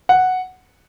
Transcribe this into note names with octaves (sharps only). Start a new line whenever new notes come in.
F#5